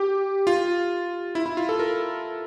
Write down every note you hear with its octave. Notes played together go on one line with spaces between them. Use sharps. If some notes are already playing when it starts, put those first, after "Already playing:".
Already playing: G4
F4
E4
E4
F4
A4
A#4